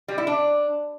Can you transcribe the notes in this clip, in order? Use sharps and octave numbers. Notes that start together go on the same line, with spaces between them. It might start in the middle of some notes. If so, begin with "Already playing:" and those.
G3
E4
D4